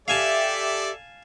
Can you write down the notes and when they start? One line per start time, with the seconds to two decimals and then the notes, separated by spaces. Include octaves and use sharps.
0.08 G4 A4 D5 E5 F5 G#5 A5